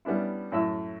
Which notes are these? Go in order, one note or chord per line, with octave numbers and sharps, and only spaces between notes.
G3 B3 C#4 D4 E4
F#2 A2 E4 E5 E6